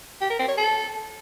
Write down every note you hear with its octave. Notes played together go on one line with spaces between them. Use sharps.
G4
A#4
C4
C#5
A4